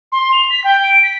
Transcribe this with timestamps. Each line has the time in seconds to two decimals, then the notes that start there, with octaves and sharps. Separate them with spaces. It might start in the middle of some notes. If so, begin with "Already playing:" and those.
0.12 C6
0.32 F7
0.50 B6
0.64 G5
0.83 D7
1.03 B6